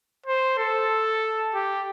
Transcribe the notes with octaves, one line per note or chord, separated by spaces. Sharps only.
C5
A4
G4